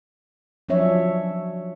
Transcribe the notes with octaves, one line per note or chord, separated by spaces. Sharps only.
F3 F#3 C#4 D4 C#5 E5